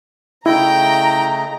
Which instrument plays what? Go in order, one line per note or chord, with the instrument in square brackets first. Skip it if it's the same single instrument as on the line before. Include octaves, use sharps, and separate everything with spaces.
[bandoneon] C#3 A3 D#5 [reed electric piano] E4 [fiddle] G5 [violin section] A#5